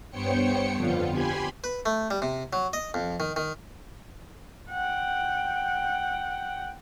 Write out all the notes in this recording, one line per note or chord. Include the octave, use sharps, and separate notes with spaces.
G2 B3 C5 C#5 G5 C#7
F2 D3 B3 F4
G4 G#5 B5 C6 G#6
B4
A3
G3
C3
F#3
D#5
F2
D#3
D#3
F#5 G5